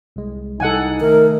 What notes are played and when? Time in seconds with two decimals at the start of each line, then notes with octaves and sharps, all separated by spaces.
0.16 C2 G#3
0.60 C2 D#4 A4 F#5 G#5
1.00 D#3 A3 A#4